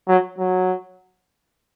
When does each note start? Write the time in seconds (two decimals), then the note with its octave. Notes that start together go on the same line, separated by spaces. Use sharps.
0.08 F#3
0.38 F#3